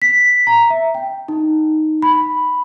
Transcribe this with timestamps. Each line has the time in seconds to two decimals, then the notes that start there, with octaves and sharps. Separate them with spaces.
0.02 B6
0.47 A#5
0.70 E5
0.95 G5
1.28 D#4
2.02 B5